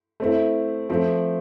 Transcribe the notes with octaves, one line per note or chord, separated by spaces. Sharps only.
A3 C4 E4
F3 A3 C4